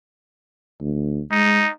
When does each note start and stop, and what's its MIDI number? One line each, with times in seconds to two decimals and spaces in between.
0.80 1.21 38
1.31 1.64 56
1.31 1.71 63